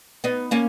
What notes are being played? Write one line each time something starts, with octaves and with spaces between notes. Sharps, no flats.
B3 D#4
A#3 C#4